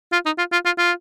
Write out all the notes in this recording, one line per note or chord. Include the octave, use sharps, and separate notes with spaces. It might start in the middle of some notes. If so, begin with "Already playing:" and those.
F4
D#4
F4
F4
F4
F4